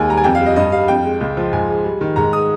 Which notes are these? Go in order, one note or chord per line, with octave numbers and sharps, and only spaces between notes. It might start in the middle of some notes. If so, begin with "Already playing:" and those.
Already playing: D#2 G#3 G#5
G3 A#5
G#5
F2 G5
F5
G3
D#5
G2 D#5
G3 F5
F2 G5
G#3
C#2
F3
G#2 G#5
G#3
G3
D#3
G#2 A#5
G#3 D#6